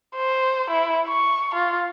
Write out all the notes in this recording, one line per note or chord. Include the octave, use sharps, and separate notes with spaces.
C5
E4
C#6
F4